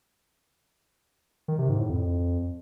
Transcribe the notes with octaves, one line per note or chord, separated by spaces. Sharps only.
D#3
C3
G#2
A2
F2